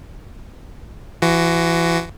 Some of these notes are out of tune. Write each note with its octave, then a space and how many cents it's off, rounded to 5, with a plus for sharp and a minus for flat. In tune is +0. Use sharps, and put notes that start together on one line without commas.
E3 +35 F#4 +10